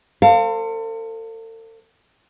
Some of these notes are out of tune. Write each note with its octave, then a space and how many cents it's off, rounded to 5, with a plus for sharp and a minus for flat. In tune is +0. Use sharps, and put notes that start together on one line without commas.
A4 +40 C5 +0 F5 +0